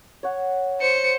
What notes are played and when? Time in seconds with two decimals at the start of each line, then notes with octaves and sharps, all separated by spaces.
0.23 C#5 F#5
0.80 C5 C#7